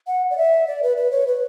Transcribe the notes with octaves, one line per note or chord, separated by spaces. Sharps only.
F#5
D5
E5
D5
B4
B4
C#5
B4